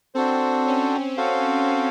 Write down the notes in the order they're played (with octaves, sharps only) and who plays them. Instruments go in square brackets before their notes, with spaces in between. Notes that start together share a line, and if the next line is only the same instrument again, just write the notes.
[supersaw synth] C4 [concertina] D4 F#4 A4 C5
[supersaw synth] C#4
[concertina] F#4 A4 C5 F5